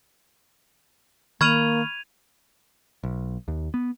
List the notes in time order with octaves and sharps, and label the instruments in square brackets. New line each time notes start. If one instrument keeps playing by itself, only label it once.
[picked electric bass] D#3 [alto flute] A#3 [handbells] B5 C#6 F6 [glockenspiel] G#6 D#7 F7
[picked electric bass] B1
D#2
B3